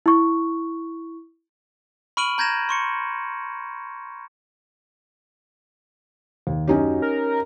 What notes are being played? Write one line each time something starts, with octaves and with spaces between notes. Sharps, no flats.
E4 C#6
B5 C#6 F6 D7 D#7 F#7
A#5 G6 G#6 A#6 E7
C6 C#6 C#7
D#2
F#2 C#4 D#4 G4
A#4